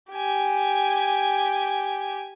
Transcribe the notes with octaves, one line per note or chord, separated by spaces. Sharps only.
G4 G#5